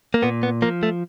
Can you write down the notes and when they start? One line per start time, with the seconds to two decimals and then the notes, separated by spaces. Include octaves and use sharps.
0.14 A#3
0.23 A#2 B3
0.43 B3
0.62 F3 A#3
0.83 A3